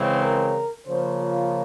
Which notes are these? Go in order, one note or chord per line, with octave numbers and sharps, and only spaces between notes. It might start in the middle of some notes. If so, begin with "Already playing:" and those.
Already playing: C#3 E3 G#3 C4
A#4
C#3 F3 A#3 C5
F4